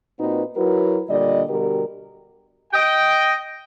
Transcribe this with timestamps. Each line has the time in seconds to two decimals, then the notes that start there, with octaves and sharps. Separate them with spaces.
0.19 A#2 C4 D#4 F#4 B4
0.56 F#3 E4 F#4 A#4 B4
1.09 A#2 D3 G3 D5 D#5
1.49 B2 D3 G3 F#4 G4 A#4
2.73 D#5 G5